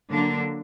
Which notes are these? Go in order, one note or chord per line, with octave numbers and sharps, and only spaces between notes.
D3 F#3 A#3 D4